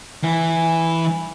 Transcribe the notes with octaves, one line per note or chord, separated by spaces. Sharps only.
E3